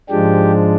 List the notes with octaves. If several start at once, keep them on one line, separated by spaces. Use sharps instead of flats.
G#2 F3 G#3 D4 G4